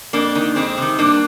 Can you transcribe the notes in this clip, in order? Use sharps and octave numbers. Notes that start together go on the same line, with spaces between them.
F2 A#3 D4
D#3
F2 G#3 C4
C3 D#3
G2 A#3 D4